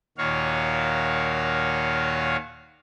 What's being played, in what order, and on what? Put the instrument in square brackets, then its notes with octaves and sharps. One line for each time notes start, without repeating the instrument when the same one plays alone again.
[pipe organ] D#2 A#2 D#3 F#4 C#5 F5